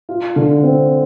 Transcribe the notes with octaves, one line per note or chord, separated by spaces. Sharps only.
F4
D3
C4